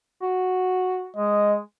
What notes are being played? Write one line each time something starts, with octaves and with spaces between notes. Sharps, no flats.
F#4
G#3 D#5